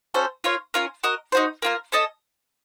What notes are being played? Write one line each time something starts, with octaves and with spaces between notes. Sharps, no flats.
C#4 F#4 A4 C5
F4 A#4 C#5 F5
C#4 F4 A#4
F#4 A#4 D#5
D#4 F#4 C5
A#3 F4 A#4
C#4 A4 D#5 A5